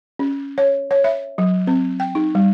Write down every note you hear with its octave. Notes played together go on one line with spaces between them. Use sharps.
C#4
C#5
C#5
E5
F#3
C4
G5
D#4
G3